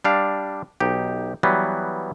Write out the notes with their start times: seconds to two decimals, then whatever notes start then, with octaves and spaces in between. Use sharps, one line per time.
0.04 G3 D4 F5
0.80 B1 D#4 G4
1.43 E3 F#3 G3 B3